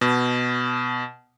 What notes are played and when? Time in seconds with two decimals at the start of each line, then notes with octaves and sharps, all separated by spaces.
0.01 B2